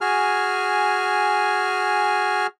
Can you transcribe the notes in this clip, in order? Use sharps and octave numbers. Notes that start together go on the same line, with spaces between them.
F#4 G#4 G#5 F6